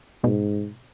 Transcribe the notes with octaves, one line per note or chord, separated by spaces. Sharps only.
G#2 B2